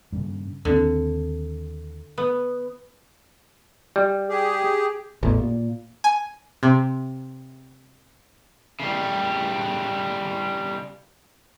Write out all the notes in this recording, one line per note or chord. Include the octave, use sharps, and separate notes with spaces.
G2 C#3
D#2 D3 C4
B3
G3
G4 G#4
A1 E2
A#2
G#5
C3
C#3 G3